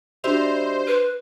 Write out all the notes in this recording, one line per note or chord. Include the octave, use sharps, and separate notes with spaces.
G3 D4 D#4 F#4 C5 E5 F7
B4